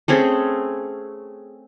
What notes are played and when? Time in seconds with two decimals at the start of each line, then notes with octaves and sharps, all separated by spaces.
0.08 A3 C4 C#4 G#4